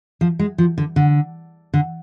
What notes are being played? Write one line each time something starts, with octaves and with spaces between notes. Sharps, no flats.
F3
G#3
F3
D3
D3
D3